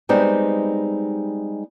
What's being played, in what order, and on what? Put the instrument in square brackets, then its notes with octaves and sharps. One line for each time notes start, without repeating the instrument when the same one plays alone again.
[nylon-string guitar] G3 G#3 B3 C4 D#4 G4